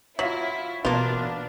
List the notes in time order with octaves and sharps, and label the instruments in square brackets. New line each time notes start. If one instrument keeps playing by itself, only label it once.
[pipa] F#3 [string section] E4 [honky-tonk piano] F4 B6
[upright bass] B2 E3 [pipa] A#3 F4 [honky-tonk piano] B3 [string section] D4